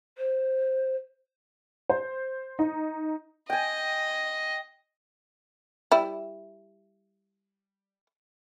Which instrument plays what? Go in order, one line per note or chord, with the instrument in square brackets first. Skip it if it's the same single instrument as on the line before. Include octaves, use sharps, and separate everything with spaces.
[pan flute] C5
[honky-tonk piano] C5
D#4
[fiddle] D#5 [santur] G5 G#5
[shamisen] G3 E4